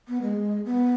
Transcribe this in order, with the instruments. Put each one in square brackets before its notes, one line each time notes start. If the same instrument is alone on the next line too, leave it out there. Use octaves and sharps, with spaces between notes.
[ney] B3
G#3
B3